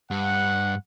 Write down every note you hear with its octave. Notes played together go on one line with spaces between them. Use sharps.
G2 F#5